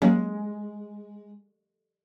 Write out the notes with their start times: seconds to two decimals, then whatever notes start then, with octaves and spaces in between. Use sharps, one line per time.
0.02 F#3 G#3 A#3 C#4